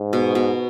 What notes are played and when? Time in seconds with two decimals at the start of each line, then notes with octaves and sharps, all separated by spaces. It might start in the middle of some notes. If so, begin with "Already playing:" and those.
Already playing: G#2
0.13 B2
0.35 B2